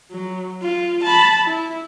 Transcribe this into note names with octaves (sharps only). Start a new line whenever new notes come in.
F#3
F4
A5 B5
E4